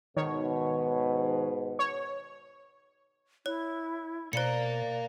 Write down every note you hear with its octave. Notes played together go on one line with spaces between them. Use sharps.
G#2 B2 D#3 C#5
C#5
E4 C#5
B2 A#3 A#4 C5 D5 C#7